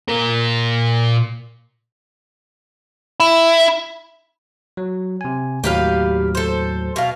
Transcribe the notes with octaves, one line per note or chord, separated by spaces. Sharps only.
A#2 A#4
E4
F#3
C3 G#5
D#2 A2 F#3 G4 B4 F5
A4 C5
B2 F5